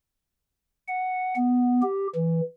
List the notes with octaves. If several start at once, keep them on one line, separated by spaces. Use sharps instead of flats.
F#5
B3
G4
E3